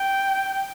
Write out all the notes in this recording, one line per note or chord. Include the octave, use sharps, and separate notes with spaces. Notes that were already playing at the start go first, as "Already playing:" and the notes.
Already playing: G5